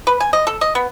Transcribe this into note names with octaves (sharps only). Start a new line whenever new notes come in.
B4
G#5
D#5
A4
D#5
B3